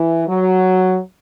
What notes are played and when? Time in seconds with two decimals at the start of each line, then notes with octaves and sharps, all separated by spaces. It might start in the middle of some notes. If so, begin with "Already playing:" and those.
Already playing: E3
0.28 F#3